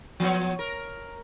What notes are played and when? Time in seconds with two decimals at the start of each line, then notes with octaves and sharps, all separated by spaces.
0.20 F3 B3 C#5
0.59 A#4